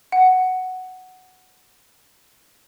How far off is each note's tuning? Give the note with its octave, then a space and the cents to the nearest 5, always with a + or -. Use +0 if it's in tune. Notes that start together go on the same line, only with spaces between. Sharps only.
F#5 +5